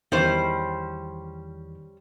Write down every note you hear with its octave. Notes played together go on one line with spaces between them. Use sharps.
E2 D#3 E3 G3 C#4 C5